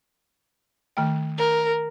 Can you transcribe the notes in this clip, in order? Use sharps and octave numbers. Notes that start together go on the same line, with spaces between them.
D#3 A3 G5
A#4